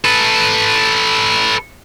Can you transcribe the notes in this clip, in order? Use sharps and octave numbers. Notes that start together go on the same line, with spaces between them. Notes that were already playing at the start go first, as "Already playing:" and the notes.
A4 B4